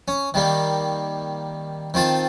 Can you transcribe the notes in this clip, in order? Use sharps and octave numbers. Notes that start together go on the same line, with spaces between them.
C#4
D#3 G3 A#3
D#3 C4 F4 A5